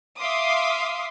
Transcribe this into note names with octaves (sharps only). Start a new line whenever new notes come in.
E5 F5 C6 D6 D#6